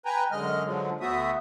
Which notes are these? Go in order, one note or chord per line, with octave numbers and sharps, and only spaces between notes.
B4 G5 G#5 A#5
F#2 D3 G#3 D#5 F6
D3 F3 F#3 G#3
D2 A3 B3 F#4 E5 D#6